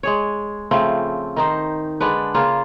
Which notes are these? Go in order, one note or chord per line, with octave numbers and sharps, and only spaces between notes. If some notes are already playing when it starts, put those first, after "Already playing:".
G#3 G#4 C#5
C#3 F3 A3 C4
D#3 D#4 C5
D3 G#3 D4 B4
C#3 A#3 F4